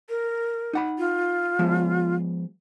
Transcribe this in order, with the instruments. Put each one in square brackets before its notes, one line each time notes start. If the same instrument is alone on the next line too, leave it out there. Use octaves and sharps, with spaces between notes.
[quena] A#4
[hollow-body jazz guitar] D#4 F#5 B5
[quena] F4
[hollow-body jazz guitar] F3 G#3 B3